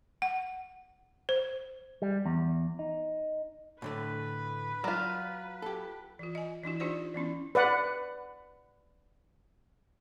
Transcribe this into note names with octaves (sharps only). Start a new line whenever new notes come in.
F#5
C5
G3
E2
D#4
A2 D3 A3 B4
F#3 F4 D5
G4 A4
E3 F4
D#5 G#5
E3 D4 E4 F#4
D4 D#4 F4 G4 C5 D5
E3 B3 C#4 E4
B4 D5 F#5